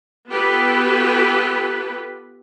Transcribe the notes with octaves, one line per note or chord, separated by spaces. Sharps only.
B3 F4 G4 A4 B4